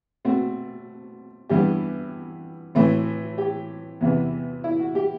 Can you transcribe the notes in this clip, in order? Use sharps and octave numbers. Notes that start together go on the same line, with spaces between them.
B2 A3 C4 F#4
G2 E3 B3 G4
A2 E3 A3 C4
G4
E2 C3 E3 B3
E4
F#4
G4